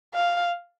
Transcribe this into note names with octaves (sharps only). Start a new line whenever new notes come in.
F5